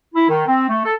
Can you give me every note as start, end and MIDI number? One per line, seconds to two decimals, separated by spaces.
0.14 0.26 64
0.29 0.44 51
0.47 0.65 60
0.69 0.84 57
0.85 0.93 69